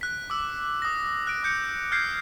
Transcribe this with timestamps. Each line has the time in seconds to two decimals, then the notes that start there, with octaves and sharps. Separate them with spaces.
0.01 F#6 B6
0.30 D6 E6
0.82 D#6 A#6
1.27 F#6 D7
1.44 D#6 G6 C#7
1.92 F6 G6 G#6 C7